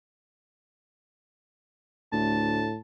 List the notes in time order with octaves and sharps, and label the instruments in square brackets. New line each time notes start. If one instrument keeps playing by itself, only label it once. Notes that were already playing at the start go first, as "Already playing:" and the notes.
[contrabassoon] D2 [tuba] A2 [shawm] A5